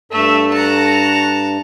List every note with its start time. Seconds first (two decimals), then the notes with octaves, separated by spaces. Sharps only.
0.12 G2 A3 A4 E5
0.53 F#4 A5 A#5